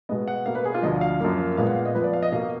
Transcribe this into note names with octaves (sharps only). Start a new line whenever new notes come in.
B2 G#3 B3 D#5
F#5
B2 A#3 F5
B4
G#4
F4
D2 D3 F3 D#5
F5
F#2 F3 A#3
A#2 G#3 B3 F5
F#5
F5
D#5
F2 F3 B3 B4
D5
F5
D#5
B2 A#3 F5